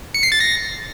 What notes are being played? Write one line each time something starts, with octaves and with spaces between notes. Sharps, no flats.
C#7
C7
A6
A#6